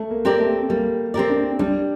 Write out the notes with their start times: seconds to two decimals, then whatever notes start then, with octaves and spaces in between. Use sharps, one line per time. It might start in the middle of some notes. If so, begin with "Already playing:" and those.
Already playing: A3
0.10 A#3
0.25 C4 G4 A#4 D5
0.40 A3
0.69 G3 A#3
1.14 C4 G4 A#4 D5
1.30 D4
1.59 G3 D4